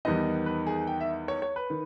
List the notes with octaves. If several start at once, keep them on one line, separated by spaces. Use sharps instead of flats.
E2 D#3 G3 B3 D#4 D#5
B4
G#4
G5
E5
C#5
C#5
B4
D#3